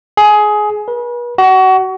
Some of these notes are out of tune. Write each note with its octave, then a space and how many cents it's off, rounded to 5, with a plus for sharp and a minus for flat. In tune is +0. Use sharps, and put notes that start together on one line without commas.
G#4 +15
B4 -40
F#4 +25